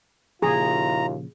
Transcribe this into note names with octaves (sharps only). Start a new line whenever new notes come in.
D#2 A#2 C#3 F3 E4 F4 G#4 A#5